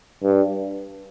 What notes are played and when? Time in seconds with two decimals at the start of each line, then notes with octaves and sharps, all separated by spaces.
0.23 G2